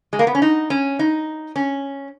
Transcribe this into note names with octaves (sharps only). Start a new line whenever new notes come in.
G#3
A#3
B3
C#4
D#4
C#4
D#4
C#4